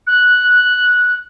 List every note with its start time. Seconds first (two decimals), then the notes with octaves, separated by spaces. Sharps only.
0.07 F#6